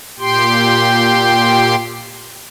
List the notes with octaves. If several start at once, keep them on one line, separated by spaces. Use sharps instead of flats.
A#2 G4 G5 C6